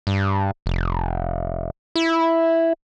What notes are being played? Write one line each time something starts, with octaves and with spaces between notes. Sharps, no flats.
G2
F1
E4